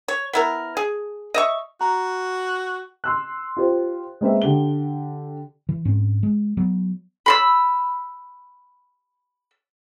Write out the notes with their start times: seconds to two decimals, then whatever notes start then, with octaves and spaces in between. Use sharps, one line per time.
0.08 C#5
0.33 B3 E4 A#4
0.77 G#4
1.34 D#5 E5 C#6
1.81 F#4 A#5
3.04 C6 E6 F#6
3.57 F4 G4 C5
4.21 G#3 A#3 C4 B4 E5
4.42 D3 G4 G7
5.69 E3
5.85 G#2 C4 C#4
6.23 G#3
6.57 F#3 B3
7.26 B5 C6 E6